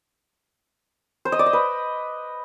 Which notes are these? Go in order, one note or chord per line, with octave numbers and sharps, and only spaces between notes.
C5
D#5
D5
D#5
B4